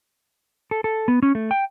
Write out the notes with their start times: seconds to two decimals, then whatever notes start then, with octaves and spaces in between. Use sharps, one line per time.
0.71 A4
0.84 A4
1.08 B3
1.23 C#4
1.35 A3
1.51 G5